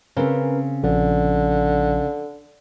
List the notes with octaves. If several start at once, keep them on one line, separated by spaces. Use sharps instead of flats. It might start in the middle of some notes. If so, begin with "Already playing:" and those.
C#3 C4 C#4 A#4 B4
A#1 D3 F3